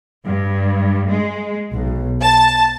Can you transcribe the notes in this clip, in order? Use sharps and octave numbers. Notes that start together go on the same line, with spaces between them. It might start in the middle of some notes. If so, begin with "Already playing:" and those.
G2
G#3
B1
A5